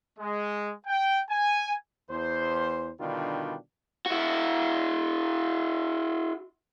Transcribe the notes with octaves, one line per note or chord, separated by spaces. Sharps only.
G#3
G5
G#5
E2 C5
B2 D3 D#3 G3 D4 F4
E4 F#4